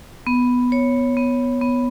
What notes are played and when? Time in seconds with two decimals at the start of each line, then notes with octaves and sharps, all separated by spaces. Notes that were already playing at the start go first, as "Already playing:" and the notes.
0.27 B3
0.72 C#5
1.17 B3
1.61 B3